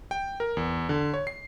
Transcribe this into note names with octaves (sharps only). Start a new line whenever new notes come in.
G5
A#4
E2
D3
C#5
C7